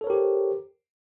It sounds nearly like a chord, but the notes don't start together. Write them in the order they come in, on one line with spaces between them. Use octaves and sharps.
A4 C#5 A#4 G4 C5